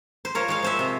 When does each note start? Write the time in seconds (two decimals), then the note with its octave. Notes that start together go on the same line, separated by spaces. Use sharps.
0.25 C5
0.35 F3 A#4 C#5
0.48 G#3 C#5 F5
0.63 F3 C5 E5
0.79 C3